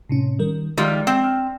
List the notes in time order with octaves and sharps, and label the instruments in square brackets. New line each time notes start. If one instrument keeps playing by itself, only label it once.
[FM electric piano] A2 C3 C#4
D#3 G3 A#4
[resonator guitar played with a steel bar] D#3 G3 F4 [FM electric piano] F3 G#3
[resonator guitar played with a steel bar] C4
[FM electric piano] F6